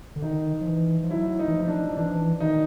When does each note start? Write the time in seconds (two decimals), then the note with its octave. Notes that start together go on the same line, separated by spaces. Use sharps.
0.16 D3
0.22 D#3 D#4
0.61 F3
0.67 E3
1.03 F3
1.10 F#3 E4
1.39 D#4
1.48 E3
1.53 F3
1.60 D#4
1.68 D4
1.97 E3 D4
2.06 F3
2.14 E3
2.40 D#3 D#4